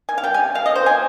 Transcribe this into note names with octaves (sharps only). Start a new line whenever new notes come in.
D#3 G#5
F5
G3 G5
G#5
C3
C3 F5
D#5
F3 C5
A#3 G#5